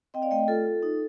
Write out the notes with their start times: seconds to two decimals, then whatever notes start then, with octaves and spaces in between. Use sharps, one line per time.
0.14 C4 D#5 G5
0.22 D5 F5
0.31 A3 D#5 G5
0.48 F4 A4
0.66 F4
0.83 D#4